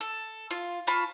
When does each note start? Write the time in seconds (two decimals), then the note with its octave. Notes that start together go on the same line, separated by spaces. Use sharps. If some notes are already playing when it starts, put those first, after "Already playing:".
0.01 A4
0.51 F4
0.87 F4 A5 B5 C#6